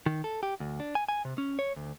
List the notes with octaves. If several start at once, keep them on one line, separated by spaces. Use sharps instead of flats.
D#3
A4
G4
D2
D4
G#5
G#5
C3
C#4
C#5
D2